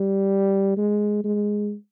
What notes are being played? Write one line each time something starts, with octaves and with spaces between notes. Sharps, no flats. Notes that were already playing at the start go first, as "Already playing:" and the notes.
Already playing: G3
G#3
G#3